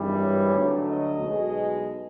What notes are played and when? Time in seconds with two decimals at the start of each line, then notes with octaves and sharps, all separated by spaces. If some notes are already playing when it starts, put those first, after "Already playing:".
Already playing: G#1 G2 E3 G3
0.20 C#5
0.53 D2 D3 F#3 A3
0.88 D#5
1.22 B1 B2 G#3